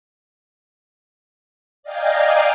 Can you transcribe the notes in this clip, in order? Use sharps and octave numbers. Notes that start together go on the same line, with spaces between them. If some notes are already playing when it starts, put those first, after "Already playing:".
D5 D#5 F5 G5 G#5 A#5